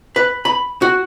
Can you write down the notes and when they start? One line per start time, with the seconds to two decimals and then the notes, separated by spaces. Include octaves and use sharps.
0.16 B4
0.45 B5
0.82 F#4